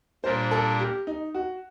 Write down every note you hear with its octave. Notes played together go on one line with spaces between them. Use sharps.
A#2 G3 A#3 D4 C5
A4
G4
D#4
F#4